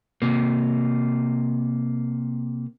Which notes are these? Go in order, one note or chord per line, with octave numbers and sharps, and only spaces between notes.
C3 A#3